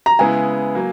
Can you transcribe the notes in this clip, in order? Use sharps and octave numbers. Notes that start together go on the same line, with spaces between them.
A#5
C#3 G#3 B3 E4 G#4 G#5
F#3 A#3